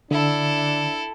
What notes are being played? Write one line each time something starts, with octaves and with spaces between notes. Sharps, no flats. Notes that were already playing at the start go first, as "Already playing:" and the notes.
D3 D4 E4 A4